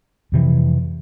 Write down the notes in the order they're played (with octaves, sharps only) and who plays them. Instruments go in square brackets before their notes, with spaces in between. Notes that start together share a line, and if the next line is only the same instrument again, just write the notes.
[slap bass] F2 C3 E3